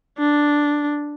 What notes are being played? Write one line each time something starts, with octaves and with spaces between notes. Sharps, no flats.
D4